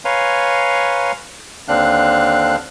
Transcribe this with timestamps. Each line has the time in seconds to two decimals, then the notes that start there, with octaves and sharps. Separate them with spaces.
0.05 B4 C#5 F5 G#5 A#5 C6
1.68 D#2 D3 C4 D4 F5 F#6